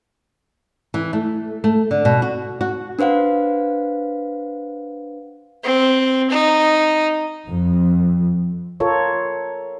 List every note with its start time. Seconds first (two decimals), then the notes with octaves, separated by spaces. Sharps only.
0.94 E3
1.13 A3
1.64 A3
1.91 D3
2.05 B2
2.22 F#4
2.61 F#4
2.99 D4 B4 C5 F5 F#5
5.64 C4
6.30 D#4
7.48 F2
8.80 F4 A4 A#4 C#5